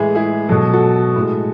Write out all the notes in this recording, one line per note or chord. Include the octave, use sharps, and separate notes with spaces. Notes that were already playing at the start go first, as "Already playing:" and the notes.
Already playing: A2 E3 G#3 E4 G#4
E4 G#4
B2 F#3 A4
F#4 A4
A2 G#3